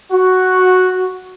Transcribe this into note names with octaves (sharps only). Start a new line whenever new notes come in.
F#4